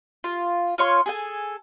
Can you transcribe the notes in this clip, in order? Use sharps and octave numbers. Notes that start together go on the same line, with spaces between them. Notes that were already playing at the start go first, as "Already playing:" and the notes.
F4
F4 C#5 C6 F6
G#4 A4 G#5